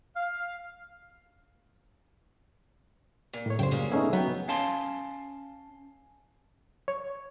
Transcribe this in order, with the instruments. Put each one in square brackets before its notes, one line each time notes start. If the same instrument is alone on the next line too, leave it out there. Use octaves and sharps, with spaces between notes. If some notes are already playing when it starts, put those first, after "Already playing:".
[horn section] F5
[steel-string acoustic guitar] A#2
[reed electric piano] A2 C#5
[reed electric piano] F#2 C#3 [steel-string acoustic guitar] C5 G5
[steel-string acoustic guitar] G3 G#3 A#3
[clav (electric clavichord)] A3 C#4 D#4 [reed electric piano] B3 G#4 E5
[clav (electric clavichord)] F#3 G5 [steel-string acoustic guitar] B3 [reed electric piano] B4
[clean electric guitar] C#4 F5 A5 C6
[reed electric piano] C#5